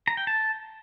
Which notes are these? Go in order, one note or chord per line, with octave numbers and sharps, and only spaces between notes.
A#5
G5
A5